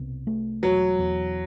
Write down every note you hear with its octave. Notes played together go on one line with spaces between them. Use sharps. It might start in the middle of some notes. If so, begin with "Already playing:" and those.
Already playing: C2 B2
A3
E1 F#3
E2